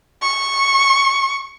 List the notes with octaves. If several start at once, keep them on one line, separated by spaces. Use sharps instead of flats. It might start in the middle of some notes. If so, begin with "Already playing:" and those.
C#6